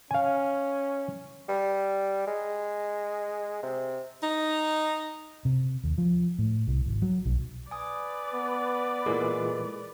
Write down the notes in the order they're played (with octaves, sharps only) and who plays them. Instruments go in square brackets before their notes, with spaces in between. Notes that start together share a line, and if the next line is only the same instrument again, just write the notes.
[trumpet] C#4 [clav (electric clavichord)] F5 G#5
[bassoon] G3
G#3
C3
[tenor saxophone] D#4
[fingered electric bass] C3
D#2
F3
A2
C2
G#1
F#3
B1
[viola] B4 D5 [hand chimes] G#5 D#6
[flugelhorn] B3
[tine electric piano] A#2 E3 G#3 [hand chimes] A4 A#4